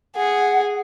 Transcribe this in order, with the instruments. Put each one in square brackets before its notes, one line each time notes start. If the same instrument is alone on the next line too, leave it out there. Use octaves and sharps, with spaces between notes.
[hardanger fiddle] G#4 [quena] F#5